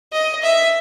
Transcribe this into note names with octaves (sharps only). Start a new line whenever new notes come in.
D#5
E5